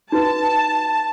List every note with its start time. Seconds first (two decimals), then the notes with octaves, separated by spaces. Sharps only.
0.12 D#4 F#4 B4 A5